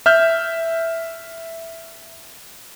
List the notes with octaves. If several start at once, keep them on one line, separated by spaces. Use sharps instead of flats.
E5 F6 G6